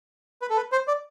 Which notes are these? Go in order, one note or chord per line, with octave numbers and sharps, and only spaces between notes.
B4
A4
B4
C5
D5